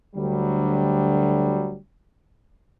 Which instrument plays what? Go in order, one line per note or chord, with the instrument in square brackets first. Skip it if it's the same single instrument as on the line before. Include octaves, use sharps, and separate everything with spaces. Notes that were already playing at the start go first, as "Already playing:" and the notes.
[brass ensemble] D2 D3 F#3 G3